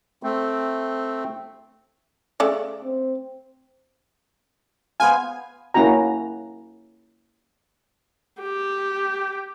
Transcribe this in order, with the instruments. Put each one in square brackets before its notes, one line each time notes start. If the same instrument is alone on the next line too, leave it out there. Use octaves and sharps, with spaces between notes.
[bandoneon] A3 C4
[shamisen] C#3 A3 D5
[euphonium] C4
[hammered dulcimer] B3 C5 F5 [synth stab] G#5
[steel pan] A#3 C#4 E4 F#4 A#5
[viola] G4